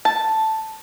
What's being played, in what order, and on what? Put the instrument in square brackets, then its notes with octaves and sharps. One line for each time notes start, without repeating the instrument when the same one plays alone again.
[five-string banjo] A5